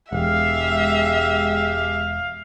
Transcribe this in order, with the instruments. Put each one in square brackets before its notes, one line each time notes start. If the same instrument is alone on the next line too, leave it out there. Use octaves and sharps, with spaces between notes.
[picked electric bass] E1 [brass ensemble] G#3 G4 [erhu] E5 [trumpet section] F5